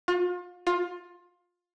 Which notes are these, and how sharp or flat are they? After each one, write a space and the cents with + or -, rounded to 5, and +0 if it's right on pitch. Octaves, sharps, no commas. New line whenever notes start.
F4 +35
F4 +20